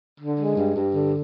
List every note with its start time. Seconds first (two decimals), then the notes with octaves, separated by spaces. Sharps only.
0.21 D3
0.39 G#3
0.58 G2
0.76 G2
0.95 D3